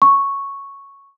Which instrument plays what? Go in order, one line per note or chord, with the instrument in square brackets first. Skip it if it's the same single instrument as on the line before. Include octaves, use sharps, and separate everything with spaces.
[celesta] C#6